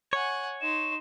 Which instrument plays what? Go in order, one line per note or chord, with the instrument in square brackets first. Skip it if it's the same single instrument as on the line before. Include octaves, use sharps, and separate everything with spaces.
[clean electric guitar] C#5 [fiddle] F#5 G#5
[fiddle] D#4 C6 [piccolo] E7